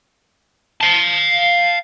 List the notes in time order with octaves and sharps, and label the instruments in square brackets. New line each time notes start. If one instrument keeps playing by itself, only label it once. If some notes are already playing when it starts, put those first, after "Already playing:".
[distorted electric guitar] F5 A5